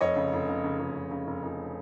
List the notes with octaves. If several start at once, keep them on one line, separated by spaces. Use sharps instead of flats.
F1 C#5 D#5
C#3
F1
C#3
C#3
F1
F1
C#3
F1
F1